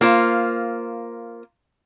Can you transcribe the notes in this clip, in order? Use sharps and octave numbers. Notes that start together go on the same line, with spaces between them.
A#3 F4 C5